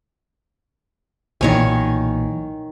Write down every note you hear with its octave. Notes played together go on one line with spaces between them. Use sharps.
B1 A#2 D#3 E3 C#5 G#5